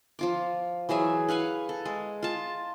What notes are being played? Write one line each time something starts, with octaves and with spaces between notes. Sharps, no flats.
F3 F4 D6
E3 F#3 G#4 E5
B4 F5 F#5 G#5
A4
G#3
F4 A5